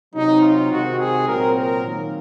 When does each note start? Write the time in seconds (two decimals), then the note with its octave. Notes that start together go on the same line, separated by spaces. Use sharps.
0.14 C3 F#3 C4 D#4
0.42 F4
0.71 C3 D#3 G#3 C4 F#4
0.99 G#4
1.28 A#2 F#3 C4 A#4
1.56 A#4
1.85 D#3 F#3 A#3